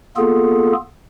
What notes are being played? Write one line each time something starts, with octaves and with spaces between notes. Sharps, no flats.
A#3 B3 F4 G#4 A4